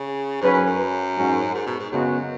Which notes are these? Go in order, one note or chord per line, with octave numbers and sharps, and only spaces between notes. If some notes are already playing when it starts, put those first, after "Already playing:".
Already playing: C#3
G#2 F#3 C#4 B4
F#2
F#2
G#2 F#3 C#4 F#4
G#2
B2
G#2
F#2 C#3 G#3 B3 F#4 B4